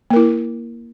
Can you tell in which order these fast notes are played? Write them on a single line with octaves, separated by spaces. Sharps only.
A#3 A#4 E4